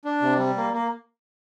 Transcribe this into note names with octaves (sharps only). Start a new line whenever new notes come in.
D4
C3
G3
A#3
A#3